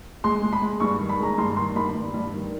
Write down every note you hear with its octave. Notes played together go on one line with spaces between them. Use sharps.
G#3 C6
G#3
B5
G#3
G2 C#6
D#3
B5
G#3 A#5
G2 C6
D#3 C6
G2 B5
G2
G2
D#3